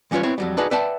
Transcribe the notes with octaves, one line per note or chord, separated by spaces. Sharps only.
E3 G3 C#4 F4 B4 C#5
B3 C4 E4 C#5
F2 F#3 G3
D#4 F#4 G#4 B4 D5 A5
B4 D5 E5 F#5 G5 A5